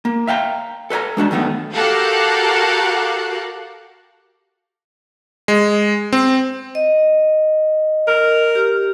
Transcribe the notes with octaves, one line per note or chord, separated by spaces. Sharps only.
A#3
E5 F5 G5 A5 A#5
A4 B4 C#5 G#5 A#5
G#3 D4 F#4 A5
F#2 D#3 A3 B3
F#4 G4 A4 A#4 F5 F#5
G#3
C4
D#5
A#4
G4